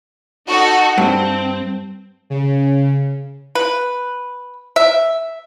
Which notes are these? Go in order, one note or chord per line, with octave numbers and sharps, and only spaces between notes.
D#4 F#4 A4
G2 C4
C#3
B4
E5